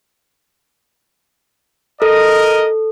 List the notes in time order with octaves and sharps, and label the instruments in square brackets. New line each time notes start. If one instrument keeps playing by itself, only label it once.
[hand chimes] A4 [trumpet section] A#4 D#5